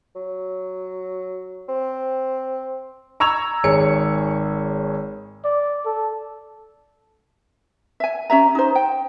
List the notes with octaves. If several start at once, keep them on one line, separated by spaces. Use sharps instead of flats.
F#3
C4
A#5 C#6 E6 G#6 F7
G#1 G#4 C#5 C#7
D5
A4
E5 G#5
C#4 G4 E5 A#5
D#4 C5
G5